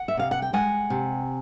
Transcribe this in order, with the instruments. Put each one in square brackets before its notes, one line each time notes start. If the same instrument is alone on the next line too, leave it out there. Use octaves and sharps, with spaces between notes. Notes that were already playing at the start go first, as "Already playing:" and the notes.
Already playing: [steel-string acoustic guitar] F#5
E5
C3 F5
F#5
G5
G#3 F#5 G#5
C3